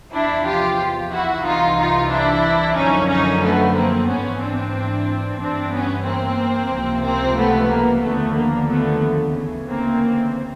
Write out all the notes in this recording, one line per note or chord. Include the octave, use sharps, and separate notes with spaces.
E2 C3 F3 D4 E4
F4 G4
E4 F#4
C2 C3 E3 D#4 F4
D#4 F4
D4 E4
F#2 D3 F3 C#4 D#4
C#4 D#4
A3 B3
A#3 C4
G#2 E3 B3 C#4
C4 D4
G2 E3 C4 D4
B3 C#4
A#3 C4
C#2 C3 F3
A#3 C4
A3 B3
A#3
D#2 D3 F3 A3 B3
A#3
A3 B3
D2 C#3 E3
A#3 C4